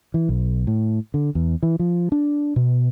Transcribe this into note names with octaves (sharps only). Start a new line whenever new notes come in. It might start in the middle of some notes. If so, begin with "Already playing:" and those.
E3
B1
A2
D3
E2
E3
F3
D4
B2